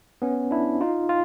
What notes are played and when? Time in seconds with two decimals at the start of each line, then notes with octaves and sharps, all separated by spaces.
0.22 B3 C#4
0.51 D4 E4
0.81 D#4 F4
1.09 F4